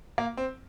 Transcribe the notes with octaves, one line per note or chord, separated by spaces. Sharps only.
A#3
C4